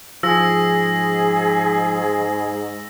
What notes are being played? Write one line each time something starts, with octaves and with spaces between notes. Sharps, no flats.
G#2 F3 G#4 E6 A#6